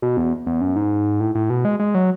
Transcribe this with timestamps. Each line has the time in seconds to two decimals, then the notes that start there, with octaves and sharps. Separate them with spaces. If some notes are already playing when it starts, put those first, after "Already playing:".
0.02 B2
0.17 E2
0.47 E2
0.61 F#2
0.76 G#2
1.20 A2
1.35 A2
1.50 B2
1.65 G#3
1.80 G#3
1.95 F#3